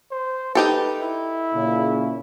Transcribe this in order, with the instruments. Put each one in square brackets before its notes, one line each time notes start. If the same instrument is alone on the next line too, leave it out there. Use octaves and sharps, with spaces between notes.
[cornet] C5
[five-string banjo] D#4 G4 A4 [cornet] B4
[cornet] E4
[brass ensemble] A#2 C#3